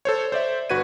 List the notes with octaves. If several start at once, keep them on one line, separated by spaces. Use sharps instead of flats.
A4 C5 C#5
C5 D5 E5
G1 F#4 B4 G#6 D#7